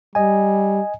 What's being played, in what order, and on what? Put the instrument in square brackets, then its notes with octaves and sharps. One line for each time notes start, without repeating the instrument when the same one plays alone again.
[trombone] G3 [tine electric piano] D#5 G#5